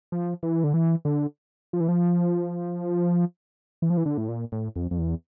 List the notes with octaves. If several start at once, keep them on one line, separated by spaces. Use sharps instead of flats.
F3
E3
D3
E3
D3
F3
E3
F3
E3
F3
E3
D3
A2
A#2
A2
F2
F2
E2